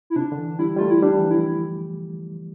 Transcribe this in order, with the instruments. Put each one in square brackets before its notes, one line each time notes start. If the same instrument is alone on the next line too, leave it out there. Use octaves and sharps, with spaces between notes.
[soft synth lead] E4
[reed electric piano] C3 [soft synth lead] D4
[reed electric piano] D3
E3
[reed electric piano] G3 [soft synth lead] E4
[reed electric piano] G3 A3 [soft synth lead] F4
[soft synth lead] E4
[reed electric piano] G3 [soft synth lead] D4
[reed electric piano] E3
F3
[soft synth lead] E4